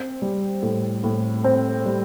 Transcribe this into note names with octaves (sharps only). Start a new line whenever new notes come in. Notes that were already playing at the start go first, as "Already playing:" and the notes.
Already playing: C4
G3
A2
A2
C4
G3